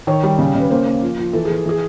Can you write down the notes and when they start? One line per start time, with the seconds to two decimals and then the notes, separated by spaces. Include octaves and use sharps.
0.07 D#3 C#5
0.23 G3
0.39 C#3
0.55 C#3
0.60 B4
0.71 A#3 C5
0.86 A#3
1.02 F3
1.18 F3
1.33 E3 A4
1.45 E3 G#4
1.66 E3 G#4